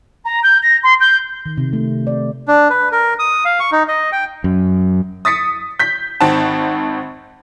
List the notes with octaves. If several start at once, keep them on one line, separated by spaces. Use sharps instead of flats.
A#5
G6
A#6
C6
G6
D#3
C3
A3
D5
D4
B4
A#4
D#6
F5
C#6
D#4
D#5
G5
F#2
D#6 A6 B6 C#7
G6 B6
G#1 D#3 C4 F#5 A5